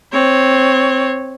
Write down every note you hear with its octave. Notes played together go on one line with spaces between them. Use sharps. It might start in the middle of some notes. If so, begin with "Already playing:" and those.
C4 C#5